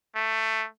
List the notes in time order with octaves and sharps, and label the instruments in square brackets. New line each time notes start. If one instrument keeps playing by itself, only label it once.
[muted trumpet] A3